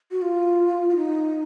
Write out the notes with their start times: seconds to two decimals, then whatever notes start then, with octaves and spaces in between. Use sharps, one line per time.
0.11 F#4
0.22 F4
0.89 F4
0.96 D#4